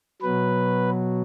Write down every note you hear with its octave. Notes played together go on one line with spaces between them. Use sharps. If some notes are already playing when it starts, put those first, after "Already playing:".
B2 F#3 B4